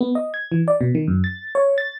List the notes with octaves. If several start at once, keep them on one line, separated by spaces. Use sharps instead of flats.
B3
D#5
G#6
E3
D5
B2
D#3
F#2
A6
C#5
A6